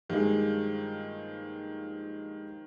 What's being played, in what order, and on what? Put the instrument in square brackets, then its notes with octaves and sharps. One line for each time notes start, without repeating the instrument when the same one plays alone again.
[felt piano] G2 G#3 [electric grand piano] D#3 F3 A#3